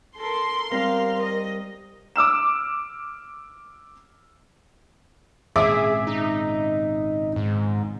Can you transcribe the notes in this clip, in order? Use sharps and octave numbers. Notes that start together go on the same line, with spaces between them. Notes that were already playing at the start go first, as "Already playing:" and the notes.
A4 A#4 C6
G3 C4 A#4 F5
D#5
D6 E6 F6 E7
G#1 A#2 C#3 G#4 E5 D6
D#4
G#2